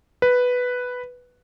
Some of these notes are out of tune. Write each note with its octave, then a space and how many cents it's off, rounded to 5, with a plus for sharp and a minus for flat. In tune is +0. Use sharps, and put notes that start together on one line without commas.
B4 +0